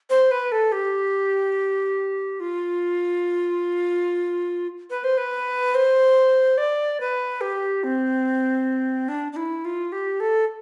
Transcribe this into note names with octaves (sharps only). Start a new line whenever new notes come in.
C5
B4
A4
G4
F4
B4
C5
B4
C5
D5
B4
G4
C4
D4
D4
E4
F4
G4
A4